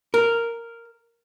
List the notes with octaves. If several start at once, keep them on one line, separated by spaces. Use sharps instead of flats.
A#4